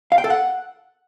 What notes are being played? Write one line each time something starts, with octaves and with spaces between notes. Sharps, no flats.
F5
G5
A4
F#5